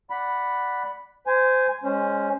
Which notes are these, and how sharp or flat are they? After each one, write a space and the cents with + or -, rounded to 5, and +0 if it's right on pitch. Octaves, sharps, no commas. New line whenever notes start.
D5 +0 F#5 +0 B5 +0
C5 -20 G#5 +0
G#3 -20 C#4 +0 C5 +0